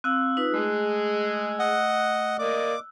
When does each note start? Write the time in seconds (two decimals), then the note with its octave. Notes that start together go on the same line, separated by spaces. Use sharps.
0.04 C4 F5 E6 F#6
0.37 D#4 F4 B4
0.54 G#3 A3 G#4
1.59 D#5 F#5
2.39 A#3 D5 D#5 D6